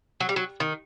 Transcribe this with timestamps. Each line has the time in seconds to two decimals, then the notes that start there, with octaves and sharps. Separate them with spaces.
0.20 F#3
0.29 G3
0.36 F#3
0.60 D#3